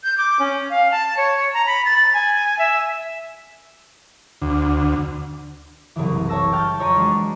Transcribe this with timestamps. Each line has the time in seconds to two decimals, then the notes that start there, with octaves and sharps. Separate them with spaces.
0.03 G6
0.18 D6
0.39 C#4
0.70 F5
0.91 A5
1.17 C#5
1.54 A#5
1.66 B5
1.85 A6
2.14 G#5
2.59 E5
4.42 D2
5.96 F#1 C2 C#3 E3
6.29 C#5 E5 A5 E6 A#6
6.52 G5 F6 G6 A6
6.79 F2 C#5 A#5 D7 D#7
6.96 E3 G#3 D4 F#4